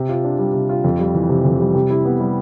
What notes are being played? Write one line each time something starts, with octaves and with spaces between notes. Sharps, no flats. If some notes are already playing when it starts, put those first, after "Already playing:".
Already playing: C3
F4
D4
G3
C3
F4
F2
G3
E3
C3
F2
G3
C3
E4
B3
G3